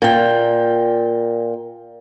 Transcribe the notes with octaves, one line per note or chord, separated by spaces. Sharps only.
A#2 G5